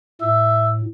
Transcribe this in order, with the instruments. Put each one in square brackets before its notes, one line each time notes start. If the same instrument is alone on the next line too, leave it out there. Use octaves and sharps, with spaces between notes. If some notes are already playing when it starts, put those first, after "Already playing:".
[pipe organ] A2 [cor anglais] E5